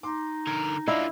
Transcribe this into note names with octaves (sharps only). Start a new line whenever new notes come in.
D#4 C6 D6
D3 A#4 G#6
D3 E4 F4 D5 D#5 F5